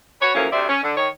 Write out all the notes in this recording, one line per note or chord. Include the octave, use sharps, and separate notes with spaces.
F#4 B4 C#5
F#2 A2 F3 A#3 C#4
D2 C3 C5 D5 E5
C#4
D3
D#3 C#5